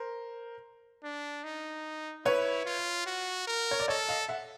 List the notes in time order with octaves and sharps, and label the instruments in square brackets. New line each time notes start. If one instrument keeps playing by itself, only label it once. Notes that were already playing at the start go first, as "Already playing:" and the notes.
Already playing: [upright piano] A#4 C5
[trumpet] D4
D#4
[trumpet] E4 [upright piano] B4 C#5
[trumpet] F4
F#4
A#4
[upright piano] C#5
D5
[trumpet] A4 [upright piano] C#5 D#5
[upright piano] D#5 F5
E5 F#5